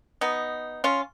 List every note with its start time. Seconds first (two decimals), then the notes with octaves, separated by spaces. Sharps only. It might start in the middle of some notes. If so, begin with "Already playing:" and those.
0.21 B3 D#4
0.84 C#4 F4